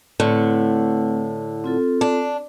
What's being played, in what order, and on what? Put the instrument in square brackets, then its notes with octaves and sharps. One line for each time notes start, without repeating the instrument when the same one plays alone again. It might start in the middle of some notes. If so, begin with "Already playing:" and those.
[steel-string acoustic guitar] A2 D3 [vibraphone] A3 C4 B4
[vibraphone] C4 F4 A4
[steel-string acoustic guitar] D4